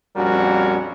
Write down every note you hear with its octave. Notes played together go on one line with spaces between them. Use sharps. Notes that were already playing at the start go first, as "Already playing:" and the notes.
A#1 F2 G3 C#4 F#4 A#4